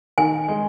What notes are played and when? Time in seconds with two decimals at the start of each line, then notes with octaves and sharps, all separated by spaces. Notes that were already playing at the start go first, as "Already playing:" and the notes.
0.18 D#3 G#5
0.48 G#3